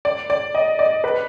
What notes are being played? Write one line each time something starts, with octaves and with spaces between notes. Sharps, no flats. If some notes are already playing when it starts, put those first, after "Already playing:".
D5
D5
D#5
D5
B4